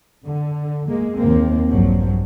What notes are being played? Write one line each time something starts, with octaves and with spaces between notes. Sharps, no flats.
D3
G#3 A#3
D#2 A#3 C4
A#1 G2 F3 F#3